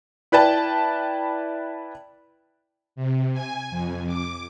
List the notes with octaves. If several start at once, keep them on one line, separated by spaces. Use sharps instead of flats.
E4 B4 D5 G5 A5
C3
G#5
F2
D6